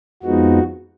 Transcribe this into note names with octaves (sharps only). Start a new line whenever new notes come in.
F2 F3 G#3 B3 D#4 F#4